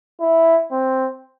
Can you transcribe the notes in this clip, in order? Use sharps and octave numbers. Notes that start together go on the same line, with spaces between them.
E4
C4